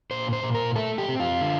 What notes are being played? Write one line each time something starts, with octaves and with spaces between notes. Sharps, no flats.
A#2 C5
C5
A#2
A#4
A3 A4
G4
C4
F4
D3